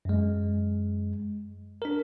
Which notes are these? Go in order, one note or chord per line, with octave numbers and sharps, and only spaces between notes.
F#2 G#3
D4 A#4